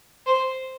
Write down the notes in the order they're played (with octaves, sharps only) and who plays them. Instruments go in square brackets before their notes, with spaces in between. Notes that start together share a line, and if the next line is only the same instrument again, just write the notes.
[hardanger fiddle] C5